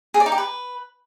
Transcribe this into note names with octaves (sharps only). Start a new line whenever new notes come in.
G#4
D5
D#4
G4
B4